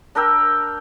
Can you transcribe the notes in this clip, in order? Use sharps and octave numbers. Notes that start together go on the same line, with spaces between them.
D4 A#4 G5 E6